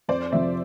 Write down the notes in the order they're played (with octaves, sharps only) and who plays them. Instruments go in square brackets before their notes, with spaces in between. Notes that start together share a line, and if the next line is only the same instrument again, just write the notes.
[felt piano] F2 [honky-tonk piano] C5 D5
[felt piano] C3 F3 [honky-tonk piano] D5 E5